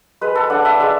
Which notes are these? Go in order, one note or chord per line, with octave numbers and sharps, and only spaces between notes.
G#3 B4
A4
D4 F#5
E5
G#3 E5